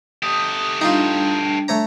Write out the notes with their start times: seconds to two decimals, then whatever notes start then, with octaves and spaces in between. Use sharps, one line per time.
0.23 A3 G4 D#6
0.81 G3 D4 D#4 F4
1.68 A3 C#5 A#5